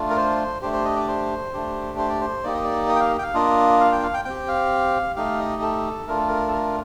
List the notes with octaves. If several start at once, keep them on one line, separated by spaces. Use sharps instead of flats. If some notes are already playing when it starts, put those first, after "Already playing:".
Already playing: A3 D4 F4
A#4
C5
A3 D4 G4 C5
C5
D#5
D5
C5
A3 D4 G4
C5
D5
C5
A#3 D#4 G4 D5
D#5
D5
D#5
G5
F5
G5
F5
A#3 D4 F4 D#5
F5
G5
F5
G5
C4 G4 G5
F5
A3 D#4 G4 F5
D#5
A4
A3 D4 F4 A#4
A4
A#4
A4
A#4